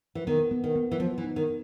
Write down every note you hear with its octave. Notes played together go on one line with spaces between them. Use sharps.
E3
D#3 B3
B3
D#3
B3
E3
F3 B3
E3
D#4
D#3